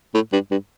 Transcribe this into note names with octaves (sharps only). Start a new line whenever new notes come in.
A2
G2
G2